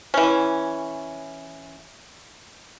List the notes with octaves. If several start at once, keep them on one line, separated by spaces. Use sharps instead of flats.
E3 C#4